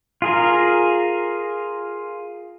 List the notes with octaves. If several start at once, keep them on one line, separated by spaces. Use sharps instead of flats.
F4 G#4 A#4